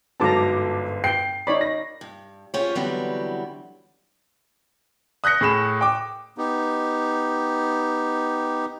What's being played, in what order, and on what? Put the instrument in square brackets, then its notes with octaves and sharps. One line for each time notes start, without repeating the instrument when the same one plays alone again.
[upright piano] G1 G#2 [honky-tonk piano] F#3 A4 D6 [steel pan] A5 A#5
[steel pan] G5 [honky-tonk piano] C7
[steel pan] D#4 C#5 B5 [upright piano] D5
[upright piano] A#6
[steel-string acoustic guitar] G2
C#4 F4 G4 G#4 C5 C#5
D3 E3 F#3 G3 B3 C4
[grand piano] D#6 F#6 G6 A#6 C#7
A2 G#4 B5 E7
G5 D6
[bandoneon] B3 D#4 G4